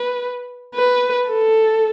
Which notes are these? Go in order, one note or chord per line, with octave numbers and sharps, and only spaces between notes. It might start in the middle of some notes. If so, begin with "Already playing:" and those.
Already playing: B4
B4
A4